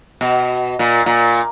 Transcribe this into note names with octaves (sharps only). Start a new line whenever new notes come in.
B2
A#2
A#2